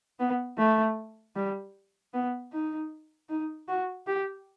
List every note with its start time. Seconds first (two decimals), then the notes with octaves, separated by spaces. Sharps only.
0.19 B3
0.58 A3
1.35 G3
2.13 B3
2.52 D#4
3.29 D#4
3.68 F#4
4.07 G4